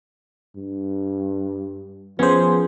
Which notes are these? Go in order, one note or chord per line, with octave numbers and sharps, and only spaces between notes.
G2
F3 B3 C#4 G#4 C5